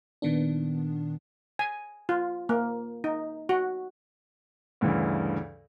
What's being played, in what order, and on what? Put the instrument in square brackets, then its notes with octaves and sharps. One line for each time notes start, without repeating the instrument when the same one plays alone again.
[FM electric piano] A#2 D#3 B3 D4
[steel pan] G#5
F4
A#3
D#4
F#4
[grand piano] D2 G2 C#3 E3